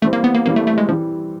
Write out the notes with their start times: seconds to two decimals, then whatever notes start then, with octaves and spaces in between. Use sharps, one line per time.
0.02 E3 G3 A3 C4
0.13 A#3
0.24 B3
0.34 A#3
0.45 E3 G3 A#3 C4
0.56 A3
0.67 A3
0.78 G#3
0.89 E3 F3 G3